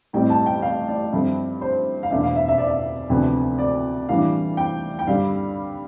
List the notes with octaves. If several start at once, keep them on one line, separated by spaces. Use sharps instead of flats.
A1 A2 G3 C4 G5
A5
G5
F5
D5
G2 F3 A3 C4
C5
F5
E2 B2 A3 D4 E5
F5
E5
E5
D5
E5
D2 C3 F3 B3 D4
D5
A2 E3 G3 D4 F5
G5
G5
G2 D3 G3 D4 F5